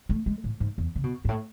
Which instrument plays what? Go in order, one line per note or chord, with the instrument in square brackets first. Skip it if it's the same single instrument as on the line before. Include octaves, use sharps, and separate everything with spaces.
[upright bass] A3
G#3
A2
G#2
E2
C#3
B2
G#2
A2